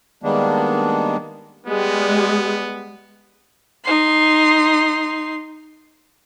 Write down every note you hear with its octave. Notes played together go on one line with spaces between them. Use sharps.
D#3 G3 G#3 A#3 B3 D4
G3 G#3 B3
D#4 C6